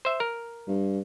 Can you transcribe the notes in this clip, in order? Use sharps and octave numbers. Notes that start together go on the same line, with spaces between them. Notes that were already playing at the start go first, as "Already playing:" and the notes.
C5 E5
A#4
G2